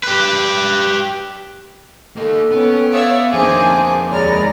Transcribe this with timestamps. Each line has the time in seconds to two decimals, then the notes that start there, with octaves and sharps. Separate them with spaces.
0.03 G4 B4
2.17 A#3 D#4 A4
2.52 B3 C#4 G5
2.91 C#5 D5 E5 F5 D#6
3.33 F2 D#3 A#3 C4 D4 G#4 C5 D6
4.11 D#2 G#3 C#5 D5 A#5 B5 F6